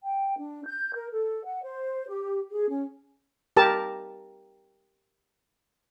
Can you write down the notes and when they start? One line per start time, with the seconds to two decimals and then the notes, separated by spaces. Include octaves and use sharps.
0.03 G5
0.38 D4
0.65 G6
0.95 A#4
1.11 A4
1.45 F#5
1.63 C5
2.08 G4
2.50 G#4
2.69 C#4
3.57 G4 A#4 A5